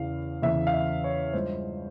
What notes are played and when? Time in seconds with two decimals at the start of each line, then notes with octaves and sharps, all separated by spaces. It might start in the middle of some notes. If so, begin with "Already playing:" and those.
Already playing: E2 C#3 E3 F5
0.42 E2 C#3 E3 E5
0.67 F5
0.74 E5
1.04 C#5
1.33 G2 F3 G#3 C5